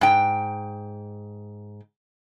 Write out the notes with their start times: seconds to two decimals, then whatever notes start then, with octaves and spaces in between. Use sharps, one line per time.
0.01 G#2 G5